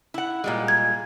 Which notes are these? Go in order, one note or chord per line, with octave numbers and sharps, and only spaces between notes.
E4 F#5
A#2 G3 G#3
G#6